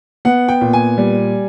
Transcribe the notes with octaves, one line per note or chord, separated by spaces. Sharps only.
B3 F#5
G5
A#2
G#5
G3